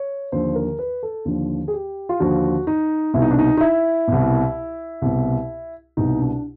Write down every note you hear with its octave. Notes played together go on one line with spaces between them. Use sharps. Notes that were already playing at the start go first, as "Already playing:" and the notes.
Already playing: C#5
D#2 D3 F3 C5
A#4
B4
A4
D#2 D3 F3
G#4
G4
F4
D#2 D3 F3 F#4
D#4
C2 B2 E4
D#4
D4
D#4
D#4
E4
C2 B2
C2 B2
C2 B2 D#4
D4